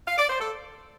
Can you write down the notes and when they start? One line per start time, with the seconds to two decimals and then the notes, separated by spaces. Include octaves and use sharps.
0.06 F5
0.17 D5
0.29 C5
0.39 A4